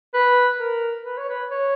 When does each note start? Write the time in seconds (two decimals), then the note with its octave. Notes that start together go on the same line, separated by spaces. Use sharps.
0.14 B4
0.59 A#4
1.05 B4
1.18 C#5
1.29 B4
1.50 C#5